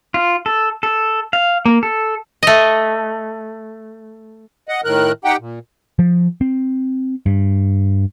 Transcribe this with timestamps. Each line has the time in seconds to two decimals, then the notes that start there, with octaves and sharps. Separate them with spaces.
0.14 F4
0.46 A4
0.83 A4
1.33 F5
1.66 A#3
1.83 A4
2.43 A3 D#5
4.69 D#5 F#5
4.84 A2 D#3 A#4 F#6
5.25 D#4 G4 F#5 G5
5.40 A#2
5.99 F3
6.41 C4
7.26 G2